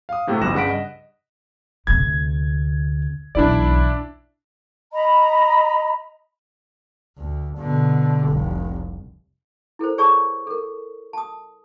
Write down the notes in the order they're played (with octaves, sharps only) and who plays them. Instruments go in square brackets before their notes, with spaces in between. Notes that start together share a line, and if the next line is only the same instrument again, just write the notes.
[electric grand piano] F5 D#6
A2 C3 A3 F#4 G4
G1 C2 F3 F#6 A#6 E7
G2 C#3 F#5 B6 D7
D#5
[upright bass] D2 C3 [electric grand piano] G#6
[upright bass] B1 E2 [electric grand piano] D4 E4 D5
[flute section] D#5 A#5 B5
[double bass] D2
B2 D3
F1 C2
[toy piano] E4 A4 A#4 C5
G#4 C#5 D5 A5 C#6 D#6
A4 A#4
A5 D#6